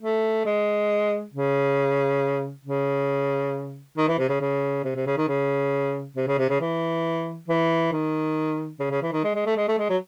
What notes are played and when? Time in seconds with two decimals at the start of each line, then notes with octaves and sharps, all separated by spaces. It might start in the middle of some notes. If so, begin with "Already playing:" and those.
0.01 A3
0.46 G#3
1.33 C#3
2.65 C#3
3.97 D#3
4.08 E3
4.19 C3
4.29 C#3
4.41 C#3
4.84 C3
4.95 C3
5.07 C#3
5.17 D#3
5.28 C#3
6.16 C3
6.27 C#3
6.38 C3
6.50 C#3
6.61 E3
7.48 E3
7.92 D#3
8.80 C#3
8.91 C#3
9.02 E3
9.13 D#3
9.24 G#3
9.35 G#3
9.46 A3
9.57 G#3
9.68 A3
9.78 G#3
9.89 F#3